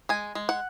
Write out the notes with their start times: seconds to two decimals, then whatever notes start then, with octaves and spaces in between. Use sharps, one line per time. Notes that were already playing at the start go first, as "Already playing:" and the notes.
0.09 G#3 G#5
0.35 G#3
0.49 F#5